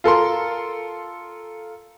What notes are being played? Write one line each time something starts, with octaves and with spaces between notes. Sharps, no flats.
F4 A4 A#4 C6